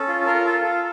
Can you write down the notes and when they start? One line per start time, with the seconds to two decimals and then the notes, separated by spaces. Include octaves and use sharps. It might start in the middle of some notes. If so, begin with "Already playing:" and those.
Already playing: C#4 A4
0.08 F4
0.26 F4 A#4
0.45 F4 A4
0.64 A4